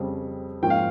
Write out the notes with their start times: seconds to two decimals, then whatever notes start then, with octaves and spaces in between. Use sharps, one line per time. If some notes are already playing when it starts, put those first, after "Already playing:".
Already playing: F2 C#3 G3 C4
0.62 G#2 F3 A#3 C#4 G5
0.70 F5